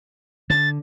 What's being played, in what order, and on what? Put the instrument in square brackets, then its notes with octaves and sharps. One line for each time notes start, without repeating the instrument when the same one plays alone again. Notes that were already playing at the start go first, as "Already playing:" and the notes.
[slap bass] D3 [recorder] A6